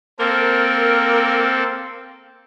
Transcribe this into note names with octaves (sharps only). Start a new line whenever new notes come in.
A#3 C4 A4 A#4